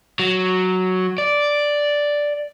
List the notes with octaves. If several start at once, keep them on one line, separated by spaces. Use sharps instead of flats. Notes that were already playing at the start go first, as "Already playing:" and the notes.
F#3
D5